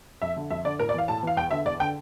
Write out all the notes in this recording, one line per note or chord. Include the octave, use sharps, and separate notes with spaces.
F2 E5
D3
F2 E5
D3 D5
A2 A#4
D5
E3 F5
A2 A5
E3 F5
E2 G5
D3 E5
E2 D5
D3 G5